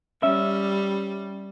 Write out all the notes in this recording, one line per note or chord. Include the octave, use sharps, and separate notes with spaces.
G3 C#4 E5